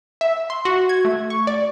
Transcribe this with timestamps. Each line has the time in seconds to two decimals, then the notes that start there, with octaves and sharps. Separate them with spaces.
0.21 E5
0.50 C6
0.65 F#4
0.89 G#6
1.05 A3
1.30 C#6
1.47 D5